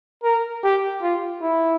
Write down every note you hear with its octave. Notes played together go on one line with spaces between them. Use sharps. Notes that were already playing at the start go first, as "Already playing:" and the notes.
A#4
G4
F4
E4